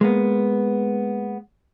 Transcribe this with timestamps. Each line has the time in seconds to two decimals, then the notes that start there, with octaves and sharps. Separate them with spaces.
0.01 G#3 A#3 B3